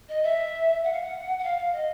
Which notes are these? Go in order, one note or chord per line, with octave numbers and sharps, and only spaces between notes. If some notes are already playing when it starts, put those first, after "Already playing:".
D#5
E5
F#5
F5
F#5
F#5
F5
F5
D#5